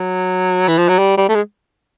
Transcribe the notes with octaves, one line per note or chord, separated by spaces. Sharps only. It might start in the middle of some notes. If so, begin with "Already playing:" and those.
Already playing: F#3
E3
F3
F#3
G3
G3
A3
G#3